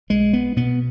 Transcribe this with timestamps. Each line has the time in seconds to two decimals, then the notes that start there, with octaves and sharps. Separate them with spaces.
0.10 B1 G#3
0.33 B3
0.56 B2 B3